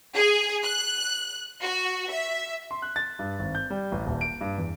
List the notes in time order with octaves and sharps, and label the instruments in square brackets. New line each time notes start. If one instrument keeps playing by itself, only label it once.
[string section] G#4
F#6
F#4
E5
[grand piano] C6
F#6
A6
G2
G#1
G6
G3
A1
D#1
D7
G2
E2